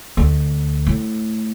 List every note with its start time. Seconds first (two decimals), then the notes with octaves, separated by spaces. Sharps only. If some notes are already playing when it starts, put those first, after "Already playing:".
0.17 D2
0.87 A2